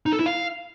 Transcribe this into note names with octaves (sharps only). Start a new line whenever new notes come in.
D#4
A4
E4
F5